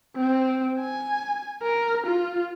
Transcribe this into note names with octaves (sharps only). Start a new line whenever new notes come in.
C4
G#5
A#4
F4